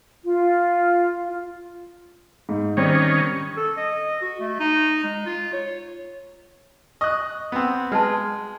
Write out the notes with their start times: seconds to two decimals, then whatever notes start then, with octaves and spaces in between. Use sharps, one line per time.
0.24 F4
2.49 G#2
2.77 D#3 G3 C4 C#4
3.57 A4
3.77 D#5
4.22 F#4
4.40 A3
4.59 D#4
5.04 G#3
5.26 F4
5.53 C#5
7.01 D#5 C#6 D#6 F#6
7.52 B3 C4
7.92 G#3 B4 D#5 A5